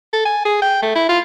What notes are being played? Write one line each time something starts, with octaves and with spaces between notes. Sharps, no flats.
A4
G#5
G#4
G5
A3
E4
F4